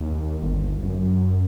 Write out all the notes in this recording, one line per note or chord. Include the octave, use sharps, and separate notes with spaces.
D#2
D#2
G1
F#2